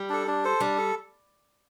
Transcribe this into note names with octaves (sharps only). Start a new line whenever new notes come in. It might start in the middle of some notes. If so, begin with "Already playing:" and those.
Already playing: G3
D4 A4
D4
A4 C5
G3 D4
A4